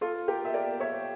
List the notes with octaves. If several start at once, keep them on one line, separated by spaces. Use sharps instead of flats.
F4 A4
G4 A#4
E5
A#4 D5
C#5 E5